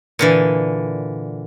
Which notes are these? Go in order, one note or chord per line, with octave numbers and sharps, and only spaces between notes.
A#2 D3 E3